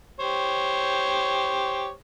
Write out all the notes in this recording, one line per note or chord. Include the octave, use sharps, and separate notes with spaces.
G4 C5 C#5